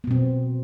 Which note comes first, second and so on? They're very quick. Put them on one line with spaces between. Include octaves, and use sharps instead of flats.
B3 B2 C4